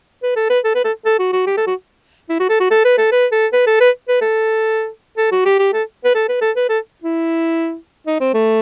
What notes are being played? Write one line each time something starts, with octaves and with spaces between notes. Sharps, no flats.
B4
A4
B4
A4
B4
A4
A4
F#4
F#4
G4
A4
F#4
E4
F#4
A4
F#4
A4
B4
A4
B4
A4
B4
A4
B4
B4
A4
A4
F#4
G4
G4
A4
B4
A4
B4
A4
B4
A4
E4
D#4
C4
A3